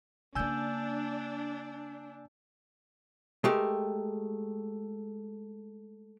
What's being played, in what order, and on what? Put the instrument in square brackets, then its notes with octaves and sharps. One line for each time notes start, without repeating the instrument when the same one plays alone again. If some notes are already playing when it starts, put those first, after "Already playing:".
[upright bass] C#3 A#3 [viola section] D4 [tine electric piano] G#5 E6 G6
[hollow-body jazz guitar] G#3 A3 G4 A#4